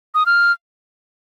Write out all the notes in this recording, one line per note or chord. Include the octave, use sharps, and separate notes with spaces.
D#6
F6